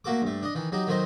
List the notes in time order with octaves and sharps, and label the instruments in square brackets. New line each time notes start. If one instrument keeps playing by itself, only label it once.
[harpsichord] A3 A#3 F#4 A4 D6
G2 A3
D4 D#5
D#3 E3
F#3 D#4 G4
D#3 F#3 A3 C5 D#5